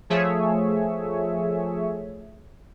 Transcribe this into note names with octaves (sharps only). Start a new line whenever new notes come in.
F3 A3 G#4 C#5 E5